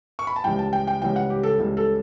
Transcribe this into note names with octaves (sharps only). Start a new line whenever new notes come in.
C#6
B5
A5
C#2 C#3 E3 G3 G5
A5
G5
G5
C#2 C#3 E3 G3 G5
F#5
G4
A4
C#2 C#3 E3 G3
A4